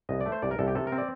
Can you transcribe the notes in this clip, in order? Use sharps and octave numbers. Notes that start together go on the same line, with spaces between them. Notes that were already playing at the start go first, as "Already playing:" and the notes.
C2 D#5
D5
A3
C5
C2 D5
A#4
C2 A4
G4
C3 A4
A#4
C4
D5